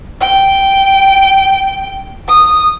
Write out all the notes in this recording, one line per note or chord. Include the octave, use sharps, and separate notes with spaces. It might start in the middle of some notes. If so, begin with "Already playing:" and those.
G5
D#6